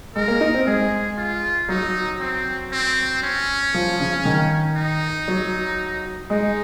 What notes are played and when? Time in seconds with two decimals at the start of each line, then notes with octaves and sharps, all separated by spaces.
0.15 G#3 A#4
0.28 A#3
0.41 D#4
0.54 C4
0.66 G#3 G#4
1.17 F4
1.69 F#3 D#4
2.20 C4
2.72 C4
3.22 C#4
3.74 F3
4.00 C#3
4.25 D#3
4.76 D#4
5.28 F#3
6.30 G#3 D#4